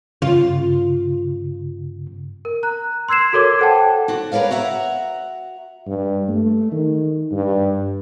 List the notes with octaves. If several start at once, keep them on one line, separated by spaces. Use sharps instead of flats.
G2 C#3 F4
A#4
A#5 F#6
C6 E6 G#6 C7 E7
F#4 A4 A#4 C#5 D6 G#6
A4 C5 F#5 G5 A5
D4 F#4
A#4 B4 C#5 D5 F5
F#4 E5 F#5 A#5
G2
A3
D#3
G2